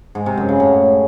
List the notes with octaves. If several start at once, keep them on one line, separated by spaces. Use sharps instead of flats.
G#2
C3
F#2
C#3
A2